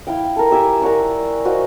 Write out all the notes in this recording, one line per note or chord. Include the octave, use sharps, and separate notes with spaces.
E4 F5 G5
A4 A#4
G4 E5 G#5 D6
A#4 D5 F#5 C#6
F#4 C5 D#5 F5